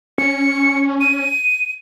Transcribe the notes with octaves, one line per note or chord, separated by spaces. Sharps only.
C#4 C#7
D#7